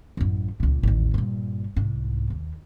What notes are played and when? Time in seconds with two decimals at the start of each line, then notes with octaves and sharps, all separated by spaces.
0.17 A1 F#2
0.60 C#2 A#2
0.83 A1 D#2
1.14 G2 A#2
1.76 C2 G#2
2.30 D#2